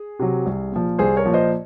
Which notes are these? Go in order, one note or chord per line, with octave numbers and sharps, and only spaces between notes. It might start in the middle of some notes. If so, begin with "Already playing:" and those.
Already playing: G#4
C3 F#3
C2
A#2 F3
C2 G#4 C5
A#4 C#5
A#2 F3
C5 D#5